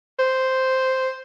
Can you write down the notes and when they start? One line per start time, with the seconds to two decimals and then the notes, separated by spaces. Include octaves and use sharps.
0.19 C5